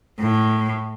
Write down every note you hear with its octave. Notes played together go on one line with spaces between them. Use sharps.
A2